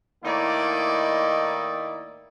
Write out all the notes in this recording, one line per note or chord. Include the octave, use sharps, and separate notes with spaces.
A2 D#3 A#3 D#4 E4 D5